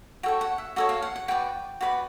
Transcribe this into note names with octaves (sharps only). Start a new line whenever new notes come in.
F#4 A4 C#5 G5
F#5
E5
F#4 A4 C#5 D#5
F5
F#5
F#5
F#4 B4 D5 G5
F#4 B4 D5